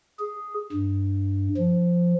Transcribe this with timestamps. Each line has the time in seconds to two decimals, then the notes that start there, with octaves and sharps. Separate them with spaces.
0.19 G#4
0.73 G2
1.57 F3